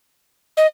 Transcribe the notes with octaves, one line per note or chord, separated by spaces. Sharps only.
D#5